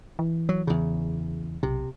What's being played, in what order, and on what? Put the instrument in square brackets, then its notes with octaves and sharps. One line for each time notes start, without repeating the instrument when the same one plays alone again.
[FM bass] E3
[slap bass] F#3
E2 C#3
[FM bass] B1 [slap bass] C3